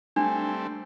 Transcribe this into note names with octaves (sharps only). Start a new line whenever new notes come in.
G3 A3 C4 D4